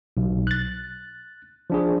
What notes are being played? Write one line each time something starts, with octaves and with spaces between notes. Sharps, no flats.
B1
F#6 A6
F3 D4 G#4